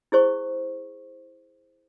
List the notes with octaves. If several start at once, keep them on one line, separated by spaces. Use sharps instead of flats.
E4 G#4 C5 C#6